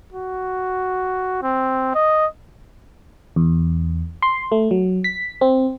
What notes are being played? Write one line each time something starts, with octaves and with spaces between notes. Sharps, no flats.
F#4
C4
D#5
E2
C6
A3
F#3
B6
C4